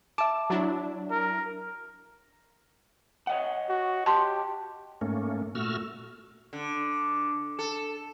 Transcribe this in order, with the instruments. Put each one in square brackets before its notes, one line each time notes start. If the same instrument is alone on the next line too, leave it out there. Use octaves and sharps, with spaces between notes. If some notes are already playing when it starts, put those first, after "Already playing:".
[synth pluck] E5 D6 [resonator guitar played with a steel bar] A5
[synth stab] F#3 D4 E4
[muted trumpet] A#4
[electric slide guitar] C#5 D#5 F#5
[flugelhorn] F#4
[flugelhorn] G4 [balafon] A5 C6
[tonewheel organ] G#2 A3 A#3 C#4
A#2 A3 F#4 E6 F6
[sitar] D3
A4